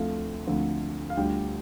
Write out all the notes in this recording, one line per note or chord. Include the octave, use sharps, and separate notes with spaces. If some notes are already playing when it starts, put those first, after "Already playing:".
Already playing: D2 D3 F3 A3 C4 F5
D2 D3 F3 A3 C4
F5
D2 D3 G3 D4 F4 G5